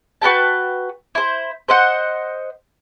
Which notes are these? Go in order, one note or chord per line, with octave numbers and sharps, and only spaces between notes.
F#4 B4 G5 A5
E4 C5
C5 D#5 F#5